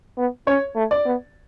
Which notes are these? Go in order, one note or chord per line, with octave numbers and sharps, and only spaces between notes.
B3
C#4 C#5
A3
D5
B3